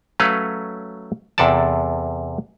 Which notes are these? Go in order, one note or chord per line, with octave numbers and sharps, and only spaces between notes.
F#3 A3 C#4 B4 F5
E2 C3 A4 D5 A5